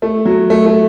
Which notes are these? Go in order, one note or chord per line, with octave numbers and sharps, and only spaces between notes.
A3
F#3
A3
A3